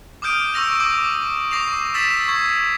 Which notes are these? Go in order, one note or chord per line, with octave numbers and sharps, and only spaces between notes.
D6 D#6 F6 G6 D7 D#7
C#6 E6 A#6 F7
D6 D#6 G6
C#6 D6 A#6 C7 F7
E6 A6 B6 E7
C#6 E6 G#6 C7